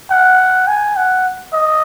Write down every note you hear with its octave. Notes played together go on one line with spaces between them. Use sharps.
F#5
G#5
F#5
D#5